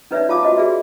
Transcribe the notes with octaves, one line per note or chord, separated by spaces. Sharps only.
C#4 D#4 B4 C#5 D5 E5
F4 F5 A5 D6 D#6
F4 F#4 C5 D#5 A5
F#4 G#4 B4 D5 E5